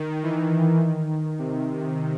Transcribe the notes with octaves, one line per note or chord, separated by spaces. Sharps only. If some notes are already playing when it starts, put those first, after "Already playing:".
Already playing: D#3
E3
D#3
C3